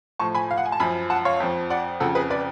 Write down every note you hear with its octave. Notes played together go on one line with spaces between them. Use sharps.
A2 F3 A5 C#6
G#5 B5
F5
F#5
G#5
A5
F#2 F3 G#5 B5
F#5 A5
C#5 F5
F2 F3
D5 F#5
F2 C#3 F3 F#4 A4
G#4 B4
B4 D5